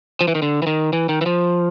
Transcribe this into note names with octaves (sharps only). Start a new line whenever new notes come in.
F3
E3
D#3
D3
E3
D#3
E3
D#3
E3
F3